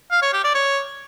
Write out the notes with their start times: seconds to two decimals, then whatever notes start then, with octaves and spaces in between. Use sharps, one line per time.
0.12 F5
0.22 C#5
0.33 G4
0.44 D5
0.55 C#5